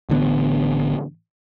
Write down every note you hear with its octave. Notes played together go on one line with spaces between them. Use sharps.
A1 D3 B3